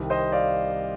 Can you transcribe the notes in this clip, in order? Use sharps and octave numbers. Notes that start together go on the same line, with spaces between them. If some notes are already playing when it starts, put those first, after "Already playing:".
Already playing: C2 C3 D#3
C5 D#5
D5 F5